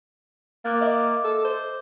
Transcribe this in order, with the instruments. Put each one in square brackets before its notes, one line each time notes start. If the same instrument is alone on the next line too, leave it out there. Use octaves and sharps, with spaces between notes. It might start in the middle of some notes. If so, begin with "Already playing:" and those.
[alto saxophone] A#3 [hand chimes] D6 F#6 A6
[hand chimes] D#5 E5 D6
[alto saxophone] A4
C5